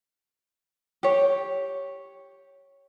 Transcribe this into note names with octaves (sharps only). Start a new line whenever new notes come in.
G4 C#5